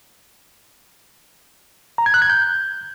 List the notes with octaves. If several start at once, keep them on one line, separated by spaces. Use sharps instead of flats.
A#5
G#6
F#6
G#6
G6